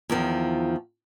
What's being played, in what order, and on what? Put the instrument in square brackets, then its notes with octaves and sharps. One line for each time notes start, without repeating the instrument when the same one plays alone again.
[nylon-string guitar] E2 D#3 F3